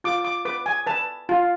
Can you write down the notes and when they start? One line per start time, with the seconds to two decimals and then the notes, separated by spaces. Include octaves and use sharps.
0.04 F4 D6
0.25 D6
0.45 B4 D6
0.66 G#5
0.87 B4 A5
1.29 F4